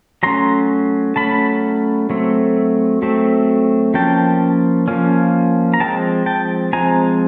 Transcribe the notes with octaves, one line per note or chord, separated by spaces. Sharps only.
F#3 A3 C#4 A#5 C6
F#3 A3 C#4 A5 B5
F#3 A3 C4
F#3 A3 C4
F3 A#3 C#4 G5 A5
F3 A#3 C#4
A#5
F3 G#3 C4 G5 A5
G5 A5
F3 G#3 C4 G#5 A#5